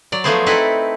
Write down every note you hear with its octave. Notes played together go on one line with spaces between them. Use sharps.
F#3 D5
F3 F#3 A3 B3 G#4 C5
C4 D#4 E4 A4 B4